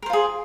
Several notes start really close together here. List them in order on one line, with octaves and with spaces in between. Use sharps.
A#4 C5 F4 G#4